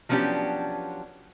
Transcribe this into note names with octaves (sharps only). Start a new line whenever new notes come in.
F3 F#3 B3 C#4 D4 G4